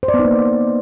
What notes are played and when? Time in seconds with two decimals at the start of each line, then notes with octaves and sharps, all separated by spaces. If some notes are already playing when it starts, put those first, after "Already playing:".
0.03 C5
0.08 D5
0.14 B3
0.19 D#4
0.25 A#3